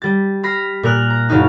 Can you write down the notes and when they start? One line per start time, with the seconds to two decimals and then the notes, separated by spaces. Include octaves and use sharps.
0.02 G3 A6
0.43 B5 F6 A#6 C7
0.83 A#2 A#4 F6 F#6
1.10 A#5
1.29 F#1 C#3 C#4 D#4 F6